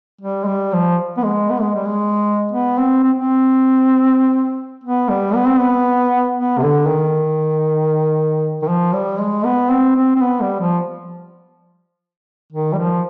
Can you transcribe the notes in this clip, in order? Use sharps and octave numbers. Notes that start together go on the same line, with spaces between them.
G3
G#3
G3
F3
B3
G#3
B3
G#3
G3
G#3
B3
C4
C4
C4
B3
G3
B3
C4
B3
B3
C3
D3
D#3
D#3
F3
G3
G#3
B3
C4
C4
C4
B3
G3
F3
D#3
G3
F3